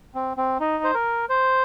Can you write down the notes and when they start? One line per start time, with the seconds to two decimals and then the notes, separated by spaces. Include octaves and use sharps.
0.15 C4
0.37 C4
0.60 D#4
0.84 C5
0.94 A#4
1.29 C5